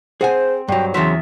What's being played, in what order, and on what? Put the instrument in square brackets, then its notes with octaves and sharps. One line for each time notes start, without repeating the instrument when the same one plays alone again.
[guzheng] C4 [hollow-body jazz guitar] G#4 F#5 G#5 [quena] C5
[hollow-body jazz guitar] G2 F#3 [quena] G5
[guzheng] E2 E5 [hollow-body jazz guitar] C#3 F#3 [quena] C6